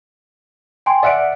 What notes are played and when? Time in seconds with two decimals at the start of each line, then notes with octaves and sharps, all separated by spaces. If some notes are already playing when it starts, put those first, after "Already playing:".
0.86 G5 G#5 C6
1.03 D5 E5 F#5 A6 D7